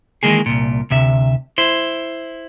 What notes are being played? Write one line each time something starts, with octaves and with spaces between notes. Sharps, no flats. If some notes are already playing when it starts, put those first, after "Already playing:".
D#3 E3 G#3 A#3 G#4
C2 A#2
D2 C3 E5
E4 C5